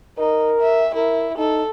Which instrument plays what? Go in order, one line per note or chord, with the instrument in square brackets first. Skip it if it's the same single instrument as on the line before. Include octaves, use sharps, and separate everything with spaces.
[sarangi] D#4 [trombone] A#4
[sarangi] E5
[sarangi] E4 [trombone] A#4
[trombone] D#4 [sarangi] A4